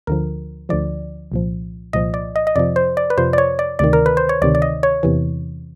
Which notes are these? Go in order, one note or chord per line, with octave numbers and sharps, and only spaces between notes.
D2 D3 F3 A#4
D2 D3 F3 D5
C2 A#2 F3
C2 A#2 F3 D#5
D5
D#5
D#5
F2 C3 F3 D5
C5
D5
B4
F2 C3 F3 C5
D5
C#5
D5
D2 C3 D#3 D5
A#4
B4
C5
C#5
D2 C3 D#3 D5
D5
D#5
C#5
E2 C3 E3